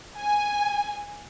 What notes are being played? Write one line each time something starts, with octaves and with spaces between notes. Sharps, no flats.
G#5